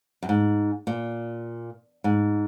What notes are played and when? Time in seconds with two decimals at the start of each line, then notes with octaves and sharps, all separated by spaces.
0.23 F#2
0.29 G#2
0.87 A#2
2.04 G#2